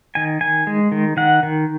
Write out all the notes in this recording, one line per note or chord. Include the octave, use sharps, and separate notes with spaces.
D#3 G#5
D#3 G#5
G#3
D#3
D#3 F#5
D#3